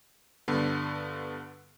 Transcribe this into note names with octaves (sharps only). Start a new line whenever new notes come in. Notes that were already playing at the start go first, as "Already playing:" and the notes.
G2 D3 B3